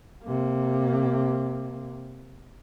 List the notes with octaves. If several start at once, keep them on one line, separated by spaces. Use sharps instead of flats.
C3 A#3